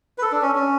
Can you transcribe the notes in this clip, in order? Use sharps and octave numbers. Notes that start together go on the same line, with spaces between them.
B4
A4
D4
C#4
C#4